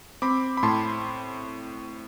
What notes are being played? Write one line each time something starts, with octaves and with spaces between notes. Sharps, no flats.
C4 B5 D6
B5
A2 A5 C6